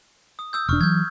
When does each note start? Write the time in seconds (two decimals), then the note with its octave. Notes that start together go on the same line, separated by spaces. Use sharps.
0.39 D#6
0.53 D#6 E6 G6
0.69 E1 D4 C#6 F6
0.81 E3 F#3 G6 G#6